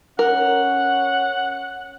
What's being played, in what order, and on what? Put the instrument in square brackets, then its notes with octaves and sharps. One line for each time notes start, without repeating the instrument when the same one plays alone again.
[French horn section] C#4 [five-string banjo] A#4 [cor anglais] F#5